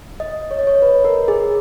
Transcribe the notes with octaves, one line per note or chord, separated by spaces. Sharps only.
D#5
C#5
D#5
C#5
B4
A#4
G#4